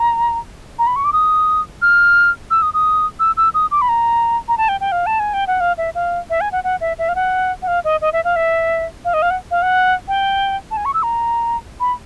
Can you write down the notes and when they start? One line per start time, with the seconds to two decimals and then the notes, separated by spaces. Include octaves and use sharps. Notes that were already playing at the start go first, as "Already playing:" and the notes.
Already playing: A#5
0.79 A#5
0.87 B5
0.96 C#6
1.05 D6
1.13 D#6
1.82 F6
2.51 E6
2.62 D#6
2.74 D#6
3.20 E6
3.37 E6
3.54 D#6
3.71 D6
3.82 B5
3.89 A#5
4.48 A#5
4.58 A5
4.69 G5
4.81 G5
4.92 F5
5.06 A5
5.20 G#5
5.34 G5
5.47 F#5
5.61 F5
5.78 E5
5.95 F5
6.30 E5
6.41 G#5
6.52 F#5
6.64 F#5
6.81 E5
6.99 E5
7.09 F5
7.15 F#5
7.62 F#5
7.68 F5
7.84 D#5
8.02 D#5
8.13 E5
8.24 F5
8.36 E5
9.05 F5
9.14 D#5
9.22 F5
9.30 F#5
9.51 F5
9.62 F#5
10.08 G5
10.71 A5
10.77 G#5
10.85 C#6
10.94 E6
11.03 A#5
11.80 B5